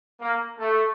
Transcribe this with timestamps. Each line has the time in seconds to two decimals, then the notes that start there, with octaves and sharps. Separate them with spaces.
0.21 A#3
0.59 A3